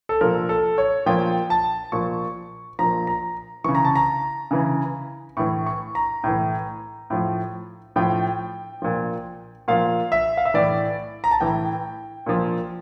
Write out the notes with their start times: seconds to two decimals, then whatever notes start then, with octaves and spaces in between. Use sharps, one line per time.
0.09 A4
0.21 A#2 F3 A#4
0.49 A4
0.78 C#5
1.06 A#2 F3 G5
1.50 A5
1.92 A#2 F3 C#6
2.79 A#2 F3 A#5
3.07 A#5
3.64 C#3 E3 C#6
3.75 A#5
3.85 A5
3.95 A#5
4.51 C#3 E3
5.37 A2 E3 C#6
5.66 C#6
5.95 A#5
6.24 A2 E3
7.10 A2 F3
7.96 A2 F3 G5
8.82 A#2 F3
9.68 A#2 F3 F5
10.12 E5
10.37 F5
10.45 E5
10.54 A2 E3 D5
11.24 A#5
11.31 A5
11.40 A2 E3 G5
12.26 A#2 F3